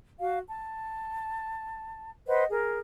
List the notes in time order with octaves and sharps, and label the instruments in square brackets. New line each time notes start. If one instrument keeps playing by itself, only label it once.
[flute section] F#4 F5
A5
B4 C5 D#5 F#5
G#4 A#4